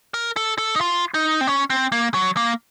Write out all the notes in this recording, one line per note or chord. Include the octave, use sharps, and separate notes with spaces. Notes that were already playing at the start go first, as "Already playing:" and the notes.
A#4
A4
A4
D#4
F4
D#4
C4
C#4
C4
A#3
F#3
A#3